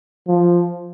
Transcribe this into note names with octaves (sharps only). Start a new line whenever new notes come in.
F3